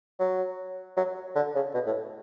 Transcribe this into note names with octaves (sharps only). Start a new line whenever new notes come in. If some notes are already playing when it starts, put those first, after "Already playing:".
F#3
F#3
D3
C#3
B2
A2